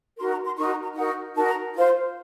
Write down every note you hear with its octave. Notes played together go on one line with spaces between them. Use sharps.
D#4 F#4 A#4 C6
A#5
C6
D#4 F#4 A#4 C#6
A#5
A#5
D#4 F#4 A#4 F#5
D#4 F#4 A#4 A5
A#5
F4 C5